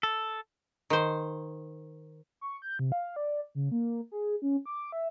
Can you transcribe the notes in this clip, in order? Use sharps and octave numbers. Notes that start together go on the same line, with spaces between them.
A4
D#3 C5
C#6
G6
C3
F5
D5
C#3
A#3
G#4
C#4
D6
E5